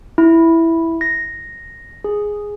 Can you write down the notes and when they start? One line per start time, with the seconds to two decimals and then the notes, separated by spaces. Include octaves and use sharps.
0.18 E4
1.01 A#6
2.04 G#4